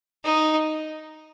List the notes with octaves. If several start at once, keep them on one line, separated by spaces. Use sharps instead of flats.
D#4